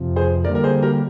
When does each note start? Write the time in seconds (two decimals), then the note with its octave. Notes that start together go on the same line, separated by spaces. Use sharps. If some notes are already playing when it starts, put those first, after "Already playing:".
Already playing: F2 C3 F3
0.16 G#4 C5
0.44 D3 G3 A#3 A#4 D5
0.55 A#4
0.64 G#4 C5
0.82 G4 A#4